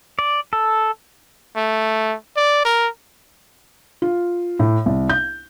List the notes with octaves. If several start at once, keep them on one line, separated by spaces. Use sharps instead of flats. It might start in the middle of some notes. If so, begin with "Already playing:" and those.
D5
A4
A3
D5
A#4
F4
A2
C2
G6